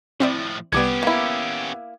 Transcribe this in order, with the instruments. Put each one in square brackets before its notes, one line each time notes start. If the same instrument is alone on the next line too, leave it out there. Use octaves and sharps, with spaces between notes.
[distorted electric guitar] A2 F3 [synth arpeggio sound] C4 E4 D5
[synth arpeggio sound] C2 C3 G3 [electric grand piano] B3 D6 G#6 [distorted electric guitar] C#4 G4
[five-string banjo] A#3 E4